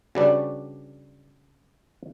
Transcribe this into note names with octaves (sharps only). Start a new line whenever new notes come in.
C#3 G3 D4 F#4 B4 D5